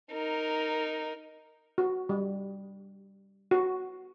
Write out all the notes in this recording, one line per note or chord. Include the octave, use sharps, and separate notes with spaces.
D#4 A#4
F#4
G3
F#4